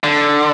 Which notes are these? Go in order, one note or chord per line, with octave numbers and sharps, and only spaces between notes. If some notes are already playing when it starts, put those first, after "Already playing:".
D3